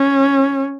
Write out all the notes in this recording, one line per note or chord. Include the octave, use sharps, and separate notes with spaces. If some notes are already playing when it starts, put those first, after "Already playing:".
Already playing: C#4